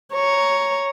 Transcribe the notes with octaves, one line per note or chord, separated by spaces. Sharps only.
C#5 A#5